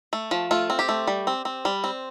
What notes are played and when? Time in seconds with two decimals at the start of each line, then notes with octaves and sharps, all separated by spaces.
0.13 A3
0.31 F3
0.51 A3 F4
0.70 C4
0.79 G4
0.89 A3
1.07 G3
1.27 C4
1.45 C4
1.65 G3
1.84 C4